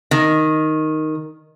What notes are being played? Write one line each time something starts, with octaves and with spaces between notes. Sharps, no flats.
D#3